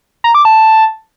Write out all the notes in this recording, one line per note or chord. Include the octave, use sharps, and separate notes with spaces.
A#5
D6
A5